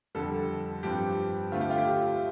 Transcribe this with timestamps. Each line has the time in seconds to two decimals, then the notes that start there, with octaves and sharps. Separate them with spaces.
0.15 F2 D3 G3 A4
0.83 G2 F3 C4 G4
1.52 D2 D3 A3 C4 F4
1.61 G4
1.70 F4
1.78 G4